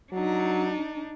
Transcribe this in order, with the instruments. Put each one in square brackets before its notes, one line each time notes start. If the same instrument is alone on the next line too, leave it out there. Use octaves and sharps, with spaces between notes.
[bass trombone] F#3 [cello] D4 D#4